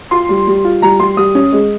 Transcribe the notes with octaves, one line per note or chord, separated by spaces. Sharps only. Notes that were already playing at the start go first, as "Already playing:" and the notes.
F4 C6
G3
G3
F4
G3 A#5
G3 C6
G3 D#6
C#4
G#3